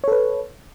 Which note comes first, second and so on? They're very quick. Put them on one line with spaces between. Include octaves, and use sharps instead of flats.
C#5 A4 B4